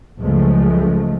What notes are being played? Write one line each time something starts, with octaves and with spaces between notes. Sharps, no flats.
C#2 F#2 F3 G#3 A3